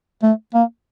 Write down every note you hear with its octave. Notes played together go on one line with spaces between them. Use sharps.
A3
A#3